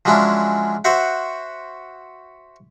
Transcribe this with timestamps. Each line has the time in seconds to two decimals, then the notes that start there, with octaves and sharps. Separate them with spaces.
0.05 F3 F#3 G#3 C#4 D4 E4
0.84 F#4 C5 E5 F#5